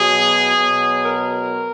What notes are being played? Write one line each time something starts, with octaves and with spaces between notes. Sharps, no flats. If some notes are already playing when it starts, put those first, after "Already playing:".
Already playing: B2 F#3 G#4
B2 F#3
A#4